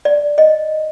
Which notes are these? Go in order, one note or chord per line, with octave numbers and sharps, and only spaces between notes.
D5
D#5